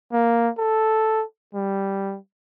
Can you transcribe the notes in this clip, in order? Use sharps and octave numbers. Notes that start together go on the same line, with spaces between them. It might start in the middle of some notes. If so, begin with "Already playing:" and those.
A#3
A4
G3